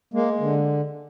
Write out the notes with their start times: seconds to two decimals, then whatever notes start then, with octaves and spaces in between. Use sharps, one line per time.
0.14 G#3 A#3
0.40 D3